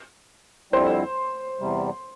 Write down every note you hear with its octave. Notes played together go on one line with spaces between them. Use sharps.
F2 D3 G3 C4 E4 C5
E2 C3 G3